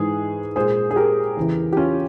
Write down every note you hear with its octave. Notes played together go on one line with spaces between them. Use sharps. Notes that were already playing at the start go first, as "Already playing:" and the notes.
Already playing: G#2 E3 G#3 G#4
A#2 G#3 G#4 C5
G#4
G4 A#4
E2 C#3 E3
G4
C#4 F4